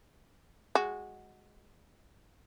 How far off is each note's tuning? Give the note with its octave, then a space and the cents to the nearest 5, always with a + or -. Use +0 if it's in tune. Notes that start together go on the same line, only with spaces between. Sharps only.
G#3 -5 F#4 +0